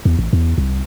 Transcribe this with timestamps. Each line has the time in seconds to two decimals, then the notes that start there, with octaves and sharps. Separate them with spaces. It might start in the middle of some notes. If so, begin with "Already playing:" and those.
0.05 E2
0.19 A1
0.33 E2
0.58 C2